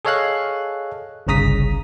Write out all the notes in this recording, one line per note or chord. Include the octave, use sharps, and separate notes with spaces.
G#4 A4 C#5 D#5 F5 F#6
G1 C2 C#3 A#5 D#6 B6